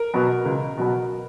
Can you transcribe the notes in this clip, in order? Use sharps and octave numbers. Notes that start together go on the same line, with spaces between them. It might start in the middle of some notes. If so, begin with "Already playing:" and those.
Already playing: A#4
B2 F#3 B3
C#2
B2 F#3 B3